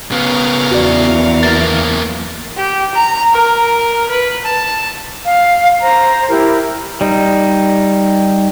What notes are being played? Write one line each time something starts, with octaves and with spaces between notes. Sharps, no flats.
C#3 B3 A#4 C#5 F5
E2 E3 F#4 D5
F#2 A#3 A6
G4
A#5
A#4
B4
A5
F5
C5 A#5
E4 G4 A#4
G3 D#4